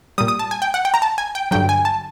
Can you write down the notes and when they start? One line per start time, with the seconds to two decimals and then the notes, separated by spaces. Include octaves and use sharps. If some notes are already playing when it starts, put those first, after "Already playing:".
0.18 A#2 G3 D#6
0.28 D#6
0.39 A5
0.51 G#5
0.62 G5
0.74 F#5
0.85 G5
0.94 A#5
1.02 A5
1.18 G#5
1.35 G5
1.51 G2 D3 F#3 G5
1.69 G#5
1.85 A5